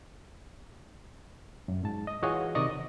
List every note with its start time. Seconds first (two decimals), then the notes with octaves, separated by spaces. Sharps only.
1.68 F#2
1.84 G#2 A5
2.07 D#5
2.22 E3 F4 F#4 G#4 C#5 D#5
2.55 C3 D#3 D5 D#5 C#6
2.71 D#5